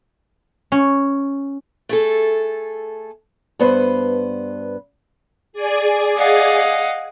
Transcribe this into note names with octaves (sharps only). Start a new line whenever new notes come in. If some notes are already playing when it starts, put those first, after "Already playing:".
C#4
A3 G#4 A4
G2 B3 B4 C5
G#4 D5 G#5
D#5 F5 F#5